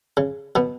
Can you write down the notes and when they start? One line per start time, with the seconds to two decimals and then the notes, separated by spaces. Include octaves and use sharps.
0.17 C#3
0.55 B2 B3